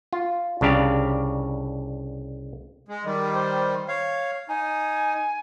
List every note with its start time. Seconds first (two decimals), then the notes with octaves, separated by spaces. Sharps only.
0.13 F4
0.61 C2 C#3 D4 G4 F5
2.89 G#3
3.05 D#3 G3
3.34 C5
3.88 C#5 F5
4.48 D#4 G#5